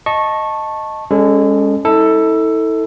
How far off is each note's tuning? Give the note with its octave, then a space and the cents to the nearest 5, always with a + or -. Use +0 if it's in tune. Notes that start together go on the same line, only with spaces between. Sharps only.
D#5 +0 A5 +0 C#6 -15
G#3 -30 C#4 +5 A4 -5
E4 -40 A4 +10